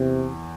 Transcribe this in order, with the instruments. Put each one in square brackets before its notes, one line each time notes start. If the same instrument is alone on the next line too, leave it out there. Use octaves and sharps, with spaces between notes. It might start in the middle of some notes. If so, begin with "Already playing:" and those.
Already playing: [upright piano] E2 E3 [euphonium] C3